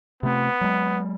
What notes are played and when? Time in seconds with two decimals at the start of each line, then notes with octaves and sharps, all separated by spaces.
0.23 C3 A3 B3 C4
0.61 F#3 G#3